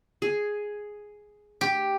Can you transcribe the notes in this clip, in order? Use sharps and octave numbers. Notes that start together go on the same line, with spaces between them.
G#4
G4